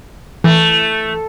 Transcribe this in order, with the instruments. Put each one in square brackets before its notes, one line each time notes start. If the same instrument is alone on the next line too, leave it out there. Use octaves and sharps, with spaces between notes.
[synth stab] E3 [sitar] A3